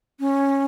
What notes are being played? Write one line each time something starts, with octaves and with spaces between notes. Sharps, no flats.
C#4